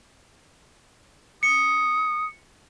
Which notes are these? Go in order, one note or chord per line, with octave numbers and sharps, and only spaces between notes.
D#6 C#7